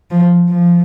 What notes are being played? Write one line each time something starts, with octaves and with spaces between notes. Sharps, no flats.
F3
F3